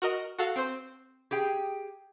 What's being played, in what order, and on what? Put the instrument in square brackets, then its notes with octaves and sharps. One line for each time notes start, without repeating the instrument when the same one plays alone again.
[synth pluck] F#4 A#4 D#5
F#4 A4 F5
C4 C5
[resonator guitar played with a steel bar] G4 G#4 G5